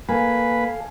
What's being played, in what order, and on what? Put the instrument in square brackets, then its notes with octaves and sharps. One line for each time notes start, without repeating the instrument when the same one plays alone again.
[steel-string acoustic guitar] A#3 [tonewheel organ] A4 F5 [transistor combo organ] B4 [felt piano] G#5